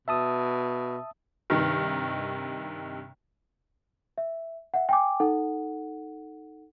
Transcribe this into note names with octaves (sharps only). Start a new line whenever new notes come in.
B2 E5 A5 D#6
G2 C3 D#3
E5
E5 F#5
G5 G#5 D6
D#4 A4 F#5